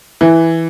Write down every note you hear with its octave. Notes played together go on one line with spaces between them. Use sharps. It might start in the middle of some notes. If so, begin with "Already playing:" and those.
E3